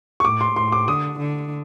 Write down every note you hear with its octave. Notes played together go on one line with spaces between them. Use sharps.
C#6
A2 D6
C6
A2 C6
D6
D3 D#6
D3